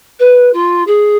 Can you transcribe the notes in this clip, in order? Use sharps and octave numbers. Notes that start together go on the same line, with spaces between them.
B4
F4
G#4